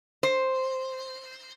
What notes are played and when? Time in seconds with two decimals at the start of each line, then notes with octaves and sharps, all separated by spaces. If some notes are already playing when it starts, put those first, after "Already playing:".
0.23 C5